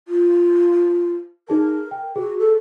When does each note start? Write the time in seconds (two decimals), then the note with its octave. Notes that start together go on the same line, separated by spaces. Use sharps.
0.08 F4
1.49 D#4 G#4 A#4 A5
1.91 G5
2.16 F#4 G#4
2.39 A4